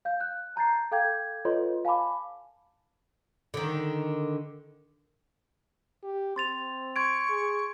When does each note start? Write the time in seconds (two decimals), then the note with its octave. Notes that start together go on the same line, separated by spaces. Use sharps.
0.05 F5 G6
0.21 F#6
0.56 A5 A#5 G6 A6 C7
0.92 A4 F5 G5 D6 G6 G#6
1.45 F4 A4 B4 C#5 D#5 C6
1.85 F5 G#5 A5 B5 D6
3.54 D3 D#3
6.03 G4
6.36 C4 C6 A6 F7
6.96 C6 C#6 G#6 D7
7.30 G#4